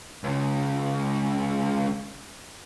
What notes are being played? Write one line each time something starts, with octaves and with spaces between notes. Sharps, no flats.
C#2 C#3